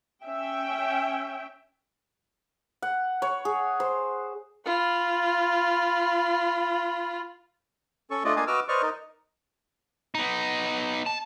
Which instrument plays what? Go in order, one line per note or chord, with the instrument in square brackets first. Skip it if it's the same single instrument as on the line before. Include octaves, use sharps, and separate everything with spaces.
[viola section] C#4 E5 G5
[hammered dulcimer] F#5
C#5
G#4
C5
[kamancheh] F4 B5
[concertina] C#4 A4 C#6
A3 D4 F4 D5 D#5
A#3 D4 D#5 F5 G#5
F#4 B4 D#5 D6 E6 F6
B4 C5 D5 D#5 C#6 F6
D#4 A#4 D#5
[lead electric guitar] B3 D#4
A5